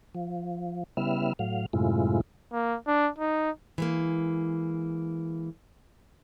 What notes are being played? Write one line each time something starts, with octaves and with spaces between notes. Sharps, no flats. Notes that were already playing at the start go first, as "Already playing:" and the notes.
F3
C#3 G3 B3 E4 E5 F6
A2 F#3 F5
F#2 A2 C3 G#3 E4 F4
A#3
D4
D#4
E3 G#3 A#3